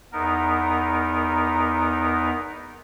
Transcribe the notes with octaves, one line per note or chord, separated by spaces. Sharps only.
E2 B3 D#4 A#4